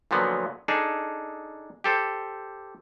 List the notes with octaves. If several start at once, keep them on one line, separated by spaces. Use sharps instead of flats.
A#2 D3 F3 F#3 B3
D4 D#4 G#4 A4
G4 A4 C5